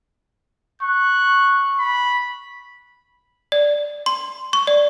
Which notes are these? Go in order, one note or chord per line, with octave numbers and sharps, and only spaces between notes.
C#6 F#6
B5
D5
C6
C#6
D5